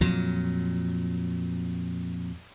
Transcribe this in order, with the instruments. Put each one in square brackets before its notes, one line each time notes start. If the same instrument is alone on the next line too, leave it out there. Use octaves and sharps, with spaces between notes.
[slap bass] F2 A#2 F#3